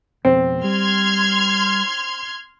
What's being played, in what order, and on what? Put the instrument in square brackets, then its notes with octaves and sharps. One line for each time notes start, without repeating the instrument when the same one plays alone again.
[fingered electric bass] F2 B2 [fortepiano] C4
[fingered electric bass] G3 [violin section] C6 F6 G#6